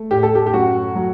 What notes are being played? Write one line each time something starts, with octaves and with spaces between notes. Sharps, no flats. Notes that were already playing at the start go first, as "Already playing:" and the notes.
Already playing: A3
A2 G4
A4
G4
G4
F#2 F#4
F#3